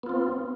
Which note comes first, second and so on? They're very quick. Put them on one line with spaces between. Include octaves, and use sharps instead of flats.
B3 F4 C4